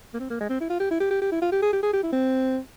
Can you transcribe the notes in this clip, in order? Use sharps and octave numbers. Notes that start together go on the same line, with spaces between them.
A#3
C4
A#3
G#3
C4
E4
F4
G4
E4
G4
G4
G4
E4
F4
G4
G#4
G4
G#4
G4
E4
C4